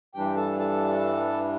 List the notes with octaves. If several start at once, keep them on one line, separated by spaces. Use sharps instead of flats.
G2 E3 G3 D4 G4 G5
A4 A5
A4 A5